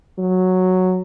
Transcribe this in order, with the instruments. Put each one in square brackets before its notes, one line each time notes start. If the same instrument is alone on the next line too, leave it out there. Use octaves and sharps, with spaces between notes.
[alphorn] F#3